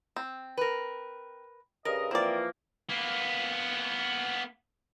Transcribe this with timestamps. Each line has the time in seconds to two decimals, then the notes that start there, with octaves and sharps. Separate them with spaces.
0.16 C4
0.57 A#4 B4
1.85 G2 C#3 A#4 D#5
2.11 E3 F3 A#3 C4 D5
2.89 A#3 B3